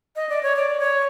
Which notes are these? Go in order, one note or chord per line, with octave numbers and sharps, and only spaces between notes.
D#5
D5
C#5
D5
C#5